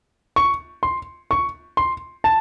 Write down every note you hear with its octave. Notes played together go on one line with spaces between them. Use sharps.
C#6
C6
C#6
C6
A5